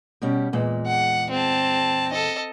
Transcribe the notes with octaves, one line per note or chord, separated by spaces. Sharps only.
B2 G3 C#4
E2 A#2 G#3
F#5
C4 A5
A4 D#5